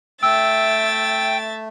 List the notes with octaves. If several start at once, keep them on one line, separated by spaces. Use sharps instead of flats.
A3 E5 G5 E6 A6